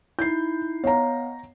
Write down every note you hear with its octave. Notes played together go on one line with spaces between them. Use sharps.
D#4 E4 G6 C7
B3 C#5 D#5 F5 A#5